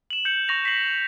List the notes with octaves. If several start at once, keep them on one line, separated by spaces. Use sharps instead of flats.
E7 F#7
G6 C#7 F#7
C#6 A#6 F7
B6 C7 F#7